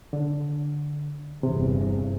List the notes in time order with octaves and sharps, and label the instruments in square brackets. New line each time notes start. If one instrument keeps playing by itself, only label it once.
[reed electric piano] D3
[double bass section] G1 E2 [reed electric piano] C3